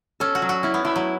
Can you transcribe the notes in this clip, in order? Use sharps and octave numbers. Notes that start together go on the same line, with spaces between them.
C#4 A4
F#4
F#3
F#4
C#4 E4
B3
A3 E4
F#3